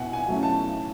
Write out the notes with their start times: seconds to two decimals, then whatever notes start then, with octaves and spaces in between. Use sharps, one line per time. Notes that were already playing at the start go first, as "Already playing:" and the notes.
Already playing: B2 E4 F#5 G#5
0.13 G#5
0.28 F#3 A3 C#4 E4
0.43 A5